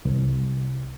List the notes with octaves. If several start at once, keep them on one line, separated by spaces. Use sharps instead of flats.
C2